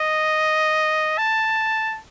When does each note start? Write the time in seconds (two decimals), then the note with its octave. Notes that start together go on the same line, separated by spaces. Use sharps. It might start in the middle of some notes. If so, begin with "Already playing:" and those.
Already playing: D#5
1.18 A5